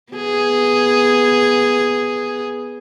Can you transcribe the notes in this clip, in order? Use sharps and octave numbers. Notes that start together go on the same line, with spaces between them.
B3 G#4